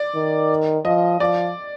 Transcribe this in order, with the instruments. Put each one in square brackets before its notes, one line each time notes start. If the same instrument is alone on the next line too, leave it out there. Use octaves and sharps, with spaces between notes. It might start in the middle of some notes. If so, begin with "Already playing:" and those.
Already playing: [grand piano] D5
[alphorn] D#3
[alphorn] F3 [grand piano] D#5
[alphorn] F3 [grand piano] D5